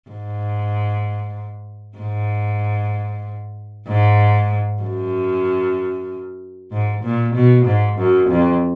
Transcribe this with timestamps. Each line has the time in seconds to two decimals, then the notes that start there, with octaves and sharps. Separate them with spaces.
0.10 G#2
1.99 G#2
3.88 G#2
4.83 F#2
6.72 G#2
7.04 A#2
7.35 B2
7.66 G#2
7.98 F#2
8.30 F2